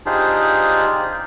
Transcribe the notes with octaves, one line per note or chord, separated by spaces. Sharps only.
D4 D#4 F4 G4 G#4 C5